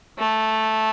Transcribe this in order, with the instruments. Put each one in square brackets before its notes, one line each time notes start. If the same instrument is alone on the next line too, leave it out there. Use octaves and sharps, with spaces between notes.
[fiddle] A3